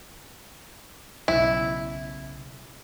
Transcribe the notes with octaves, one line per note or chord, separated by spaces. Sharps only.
B1 C#3 E4